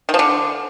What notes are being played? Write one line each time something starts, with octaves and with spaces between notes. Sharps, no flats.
D#3
F3
D3